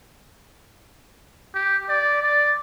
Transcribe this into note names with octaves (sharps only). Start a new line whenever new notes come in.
G4
D5
D5